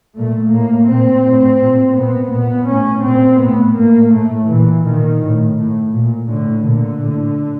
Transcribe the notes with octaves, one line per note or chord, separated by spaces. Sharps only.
A#2 A3
A2 A#3
A#2 C4
A2
A#2
A#2 B3
A#2 B3
A2 C#4
A#2 C4
A2 B3
A2 A#3
A2 A3
A#2 E3
A#2 D#3
A2
A2
A#2
A2 D3
A#2 D3
A2